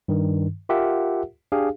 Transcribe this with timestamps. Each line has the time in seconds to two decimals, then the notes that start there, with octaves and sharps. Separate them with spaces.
0.08 G2 D#3
0.69 F4 G4 A#4 E5 F#5
1.52 D4 G4 G#4 F5